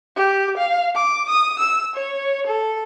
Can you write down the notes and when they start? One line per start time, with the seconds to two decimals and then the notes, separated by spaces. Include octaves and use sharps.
0.17 G4
0.58 F5
0.95 D6
1.30 D#6
1.59 E6
1.95 C#5
2.47 A4